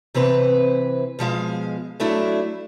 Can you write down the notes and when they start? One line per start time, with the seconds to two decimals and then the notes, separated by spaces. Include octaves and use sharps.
0.15 C3 E3 C4 B4
1.19 B2 F3 G#3 F5
2.00 F#3 A3 D4 E4